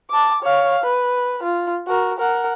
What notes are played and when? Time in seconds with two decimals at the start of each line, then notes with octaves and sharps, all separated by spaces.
0.11 A5 D6
0.43 C#5 F5
0.83 B4
1.43 F4
1.87 F#4 A#4
2.18 A#4 F#5